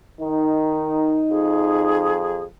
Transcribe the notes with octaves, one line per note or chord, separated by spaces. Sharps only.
D#3 D#4
F2 G#4